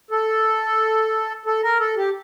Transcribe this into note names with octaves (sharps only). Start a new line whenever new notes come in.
A4
A4
A#4
A4
G4